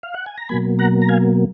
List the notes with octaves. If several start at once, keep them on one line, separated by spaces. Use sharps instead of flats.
F5
F#5
G#5
A#5
B2 F#3 A#3 G#5 B5
F#5 A#5
A#5
F5 G#5